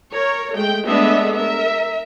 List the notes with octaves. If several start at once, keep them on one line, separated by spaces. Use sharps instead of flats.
A#4 C#5
G#3 A3 G5
G#3 A3 B3 D4 D#5 E5
A#4 E5